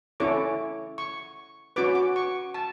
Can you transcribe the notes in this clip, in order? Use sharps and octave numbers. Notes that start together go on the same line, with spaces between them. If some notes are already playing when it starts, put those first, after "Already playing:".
C#4 E4 A4 C#5 D6
C#6
C#4 F#4 B4 D6
D6
C#6
A5